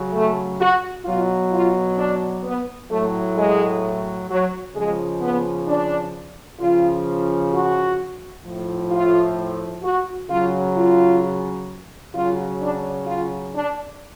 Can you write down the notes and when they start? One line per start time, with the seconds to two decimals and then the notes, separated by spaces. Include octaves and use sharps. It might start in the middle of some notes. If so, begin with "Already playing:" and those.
Already playing: C#3 F#3
0.13 A3
0.59 F#4
1.05 B2 F#3 F4
1.52 F4
1.97 D4
2.44 B3
2.90 A2 F#3 A3
3.36 G#3
4.29 F#3
4.74 C#3 F3 G#3
5.21 B3
5.67 D4
6.60 C#3 F3 F4
7.52 F#4
8.44 A2 F3
8.91 F4
9.83 F#4
10.29 C#3 F#3 F4
10.75 F4
12.14 C#3 F#3 F4
12.60 D4
13.06 F4
13.53 D4